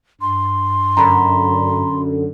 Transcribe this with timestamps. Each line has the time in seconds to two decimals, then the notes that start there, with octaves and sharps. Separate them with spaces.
0.21 G2 C6
0.97 F#2 D3 A#5 B5